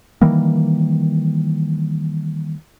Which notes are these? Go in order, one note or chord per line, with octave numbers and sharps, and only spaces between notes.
D#3 E3 G3 A#3